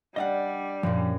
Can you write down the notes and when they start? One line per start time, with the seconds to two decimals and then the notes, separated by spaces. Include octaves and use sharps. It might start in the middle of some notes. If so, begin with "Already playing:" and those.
0.16 G3 D4 D#5 F5 F#5
0.83 F#2 A#2 F3